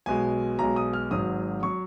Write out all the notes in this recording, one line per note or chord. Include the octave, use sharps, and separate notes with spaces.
B1 B2 G#3 G#5
B1 B2 G#3 A#5
D#6
F6
G#1 G#2 F#3 D#6
F#3 C#6